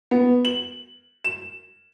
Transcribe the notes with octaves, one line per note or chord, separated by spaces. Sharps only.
B3
F#7
E7